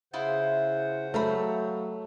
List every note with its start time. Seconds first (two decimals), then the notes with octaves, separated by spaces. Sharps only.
0.13 C#3 E4 F4 C5 D#5 F#5
1.14 F#3 A3 F5 A#5 B5